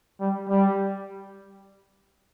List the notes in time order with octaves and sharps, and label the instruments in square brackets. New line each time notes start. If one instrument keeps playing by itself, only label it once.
[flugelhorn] G3
G3